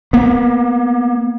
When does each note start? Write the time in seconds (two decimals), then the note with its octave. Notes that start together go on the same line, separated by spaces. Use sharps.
0.13 A#3 B3